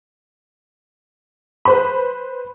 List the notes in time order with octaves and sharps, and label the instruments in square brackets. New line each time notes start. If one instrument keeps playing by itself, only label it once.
[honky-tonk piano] B4 C5 B5